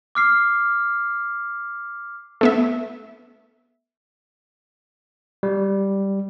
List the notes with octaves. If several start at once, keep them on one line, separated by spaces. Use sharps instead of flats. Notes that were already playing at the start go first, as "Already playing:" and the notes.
D6 F6 C7
A3 B3 E5
G3